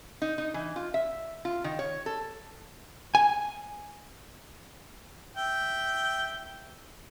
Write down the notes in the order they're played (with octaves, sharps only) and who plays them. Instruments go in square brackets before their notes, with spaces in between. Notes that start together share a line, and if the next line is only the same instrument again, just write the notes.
[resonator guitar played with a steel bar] D#4
D#4
E3
F4
E5
F4
D#3
C#5
A4
[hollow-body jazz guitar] G#5
[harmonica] E5 G5